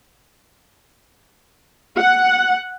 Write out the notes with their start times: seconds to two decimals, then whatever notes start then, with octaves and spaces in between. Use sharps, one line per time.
1.99 F#5